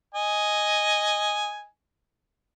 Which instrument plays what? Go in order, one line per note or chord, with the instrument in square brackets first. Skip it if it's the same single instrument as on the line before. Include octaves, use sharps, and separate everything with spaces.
[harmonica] D#5 G#5